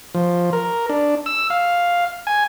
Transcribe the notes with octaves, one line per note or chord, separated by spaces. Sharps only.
F3
A#4
D4
E6
F5
G#5